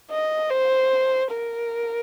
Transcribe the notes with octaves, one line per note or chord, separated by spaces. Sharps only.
D#5
C5
A#4